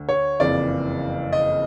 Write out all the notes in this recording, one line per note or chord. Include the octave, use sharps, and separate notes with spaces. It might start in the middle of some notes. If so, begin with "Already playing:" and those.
Already playing: D2 D3
C#5
F#1 F2 C#3 E3 D5
D#5